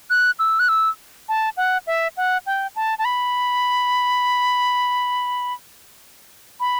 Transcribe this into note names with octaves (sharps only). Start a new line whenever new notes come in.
F#6
E6
F#6
E6
A5
F#5
E5
F#5
G5
A5
A5
B5
B5